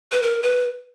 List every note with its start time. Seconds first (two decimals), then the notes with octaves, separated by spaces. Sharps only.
0.12 B4
0.22 A#4
0.43 B4